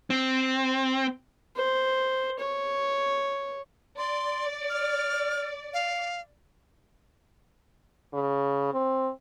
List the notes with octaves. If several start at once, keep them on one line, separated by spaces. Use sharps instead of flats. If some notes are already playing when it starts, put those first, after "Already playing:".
C4
C5
C#5
D5 C6
F6
F5
C#3
C4